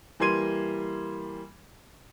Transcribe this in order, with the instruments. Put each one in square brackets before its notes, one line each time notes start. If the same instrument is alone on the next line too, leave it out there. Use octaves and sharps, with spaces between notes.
[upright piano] E3 G3 A#3 C6 G#6 D#7